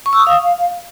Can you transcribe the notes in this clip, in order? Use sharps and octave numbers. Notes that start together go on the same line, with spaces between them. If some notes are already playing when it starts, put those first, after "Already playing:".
C#6
E6
D#6
F5